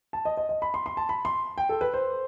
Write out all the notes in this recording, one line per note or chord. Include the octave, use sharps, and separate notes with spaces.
A5
D#5
D#5
D#5
B5
C6
C6
A5
B5
C6
G5
A4
B4
C5